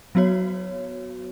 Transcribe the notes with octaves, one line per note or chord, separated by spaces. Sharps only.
F#3 B3 F#4 C#5